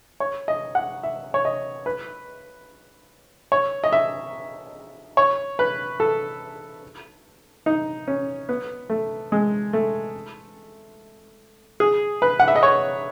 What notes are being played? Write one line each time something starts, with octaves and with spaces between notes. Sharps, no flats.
C#5
D#5
F#5
E5
C#5
D#5
B4
C#5
D#5
E5
C#5
B4
A4
D#4
C#4
B3
A3
G#3
A3
G#4
B4
F#5
E5
D#5
C#5